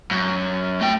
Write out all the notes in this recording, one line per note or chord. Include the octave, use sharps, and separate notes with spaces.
F#2
A3 G5